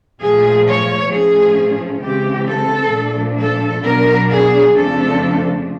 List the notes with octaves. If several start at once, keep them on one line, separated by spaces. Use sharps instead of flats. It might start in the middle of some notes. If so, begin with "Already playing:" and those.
A#2 F3 A3 G#4
C#5
A2 F3 A3 C#4 G#4
C#3 E3 G#3 C4 G4
A4
A#2 F3 A3 D4
A4
B2 F#3 B3 D4 A#4
G#4
F2 C#3 F3 A3 D4 A4